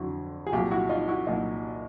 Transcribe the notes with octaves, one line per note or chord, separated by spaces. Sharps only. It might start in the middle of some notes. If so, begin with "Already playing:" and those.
Already playing: F2 D3 F#3 E4 F#4
G#4
C2 A#2 F#3 F4 G4
E4 F#4
D#4 F4
E4 F#4
C2 A#2 F#3 D#4 F4